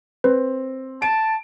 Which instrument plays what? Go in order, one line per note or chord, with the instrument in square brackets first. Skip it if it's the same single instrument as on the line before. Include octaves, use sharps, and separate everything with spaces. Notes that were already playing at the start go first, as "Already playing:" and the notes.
[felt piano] C4 [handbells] B4
[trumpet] A5 [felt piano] D7